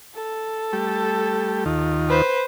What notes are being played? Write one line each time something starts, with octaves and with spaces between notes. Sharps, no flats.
A4
G3 A3 G4
D#2 D#3 F4
B4 C5